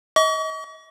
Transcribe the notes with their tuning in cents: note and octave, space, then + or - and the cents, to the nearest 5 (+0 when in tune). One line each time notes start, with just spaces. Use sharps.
D#5 +30 C#6 +45